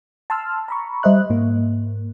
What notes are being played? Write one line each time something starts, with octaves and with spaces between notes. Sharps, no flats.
A5 C6 E6 F6
A#5 B5 C#6
G3 C5 D#5 E5 F#6
G#2 A#3